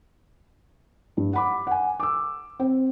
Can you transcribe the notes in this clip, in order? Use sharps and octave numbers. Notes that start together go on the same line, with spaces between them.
G2
F#5 B5 D6
F#5 G#5
D6 E6
C4